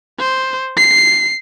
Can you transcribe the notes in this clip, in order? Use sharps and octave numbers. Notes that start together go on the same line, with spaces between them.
C5
C7